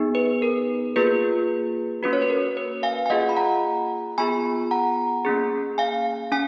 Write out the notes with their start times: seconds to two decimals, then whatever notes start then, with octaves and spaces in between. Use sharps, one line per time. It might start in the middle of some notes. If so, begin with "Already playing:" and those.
Already playing: B3 D#4 G#4
0.15 B4
0.42 A#4
0.96 A#3 F4 G#4 B4
2.03 A#3 C#4 F#4 B4
2.13 C#5
2.22 B4
2.30 A#4
2.57 B4
2.83 F5 G#5
3.06 G#5
3.10 A#3 F4 G#4 D#5 F#5
3.29 B5
3.36 F#5 A#5
4.18 B3 F4 G#4 G#5 B5
4.71 F#5 A#5
5.25 A#3 C#4 G#4
5.78 F5 G#5
6.32 C#4 G#5